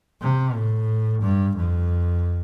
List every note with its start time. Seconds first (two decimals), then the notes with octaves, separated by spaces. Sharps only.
0.22 C3
0.55 A2
1.22 G2
1.56 F2